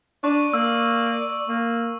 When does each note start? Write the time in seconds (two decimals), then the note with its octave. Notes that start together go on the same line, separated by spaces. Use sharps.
0.24 D4 D5 C#6
0.54 A#3 E6
1.48 A#3